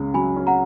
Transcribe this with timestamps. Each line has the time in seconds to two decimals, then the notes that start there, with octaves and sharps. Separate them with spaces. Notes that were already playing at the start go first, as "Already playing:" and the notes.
Already playing: C#2 C#3 C#4
0.14 F#3 G#5 B5
0.36 C#4
0.47 F#5 A#5